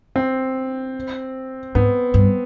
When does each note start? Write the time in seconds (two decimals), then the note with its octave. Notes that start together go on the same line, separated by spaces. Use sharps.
0.16 C4
1.75 G#2 B3
2.14 G2